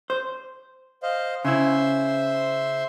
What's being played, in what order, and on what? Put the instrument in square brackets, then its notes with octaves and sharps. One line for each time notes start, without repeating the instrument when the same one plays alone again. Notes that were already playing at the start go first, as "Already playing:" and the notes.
[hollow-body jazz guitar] C5
[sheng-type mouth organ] C5 D#5 F5
[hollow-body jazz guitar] C#3 E4 [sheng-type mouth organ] C5 E5 C6